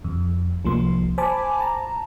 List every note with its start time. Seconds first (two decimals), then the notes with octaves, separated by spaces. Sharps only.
0.04 F2
0.65 C2 F3 A#3 C6
1.18 C5 G#5 A5 B5 D6
1.60 A5 A#5